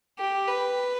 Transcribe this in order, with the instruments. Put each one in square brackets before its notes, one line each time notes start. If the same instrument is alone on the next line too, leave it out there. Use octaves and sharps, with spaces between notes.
[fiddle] G4
B4